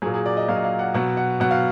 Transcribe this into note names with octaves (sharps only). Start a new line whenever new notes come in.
A#2 F#3 G#4
G#4
D5
D#5
A#2 F#3 F5
D#5
F5
F#5
B2 F#3 F#5
F#5
B2 F#3 F#5
F5